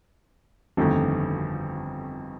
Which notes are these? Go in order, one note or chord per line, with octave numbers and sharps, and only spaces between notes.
G1 F2 D#3 A3